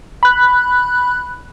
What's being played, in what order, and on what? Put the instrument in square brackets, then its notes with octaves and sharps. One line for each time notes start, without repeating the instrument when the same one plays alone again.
[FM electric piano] B5 F#6